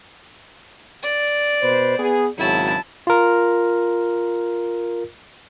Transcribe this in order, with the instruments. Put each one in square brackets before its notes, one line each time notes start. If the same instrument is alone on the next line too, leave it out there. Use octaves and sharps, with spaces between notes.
[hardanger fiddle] D5
[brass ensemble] B2 B4 C5
B3 G#4
[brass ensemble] G#1 C#3 F#3 [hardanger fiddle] E4 A5
[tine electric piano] F4 A#4